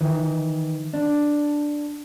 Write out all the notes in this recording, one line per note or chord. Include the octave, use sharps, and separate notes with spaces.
D#3 E3
D4